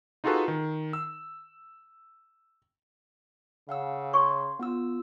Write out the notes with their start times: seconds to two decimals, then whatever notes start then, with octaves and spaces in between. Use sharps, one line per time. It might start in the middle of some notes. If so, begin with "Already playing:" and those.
0.24 D#4 F4 F#4 G#4 A4 B4
0.48 D#3
0.93 E6
3.69 C#3 F5 F#5 E6
4.13 G#4 C#5 C6 C#6
4.59 B3 F4 E6